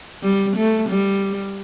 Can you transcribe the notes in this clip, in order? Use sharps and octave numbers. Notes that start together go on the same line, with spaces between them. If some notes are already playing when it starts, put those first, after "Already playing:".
G3
A3
G3